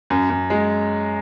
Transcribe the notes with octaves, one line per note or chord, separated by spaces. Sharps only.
F#2
F#2
G#3